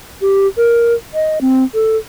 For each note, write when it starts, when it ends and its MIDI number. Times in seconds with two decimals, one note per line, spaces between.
0.22 0.47 67
0.57 0.94 70
1.14 1.39 75
1.41 1.64 60
1.74 1.97 69